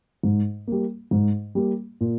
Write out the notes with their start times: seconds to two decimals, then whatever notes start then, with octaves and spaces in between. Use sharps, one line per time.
0.23 G#2
0.67 G3 A#3
1.11 G#2
1.55 G3 A#3
2.01 A#2